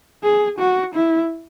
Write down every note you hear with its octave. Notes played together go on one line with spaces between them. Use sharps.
G#4
F#4
E4